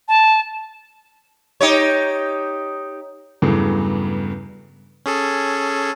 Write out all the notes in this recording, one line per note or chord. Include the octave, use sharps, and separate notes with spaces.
A5
D#4 G4 C#5
E2 G2 C#3 E3 F#3 A3
C#4 G#4 A4